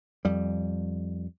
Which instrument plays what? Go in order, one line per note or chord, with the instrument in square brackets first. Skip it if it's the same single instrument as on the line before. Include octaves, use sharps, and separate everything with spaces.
[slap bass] F2 G3